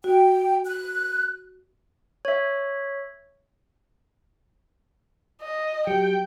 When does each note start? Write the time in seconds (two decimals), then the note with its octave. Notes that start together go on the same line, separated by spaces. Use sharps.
0.04 F#4 G5
0.66 F#6
2.25 C#5 E5
5.42 D#5
5.87 F#3 G4 G5 C#7